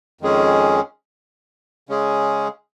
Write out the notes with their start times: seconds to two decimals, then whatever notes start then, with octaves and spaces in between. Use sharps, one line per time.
0.21 F2 D#3 G#3 C#4 G#4
1.89 C#3 G#3 C#4 G#4